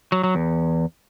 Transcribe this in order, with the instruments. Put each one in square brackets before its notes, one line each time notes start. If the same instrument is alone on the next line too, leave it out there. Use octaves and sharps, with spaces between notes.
[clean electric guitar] F#3
F#3
E2